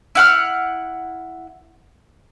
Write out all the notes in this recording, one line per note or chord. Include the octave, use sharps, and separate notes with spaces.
E4 F#5 F6